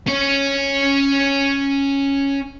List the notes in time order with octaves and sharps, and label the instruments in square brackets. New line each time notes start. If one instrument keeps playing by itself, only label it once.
[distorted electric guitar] C#4 C#5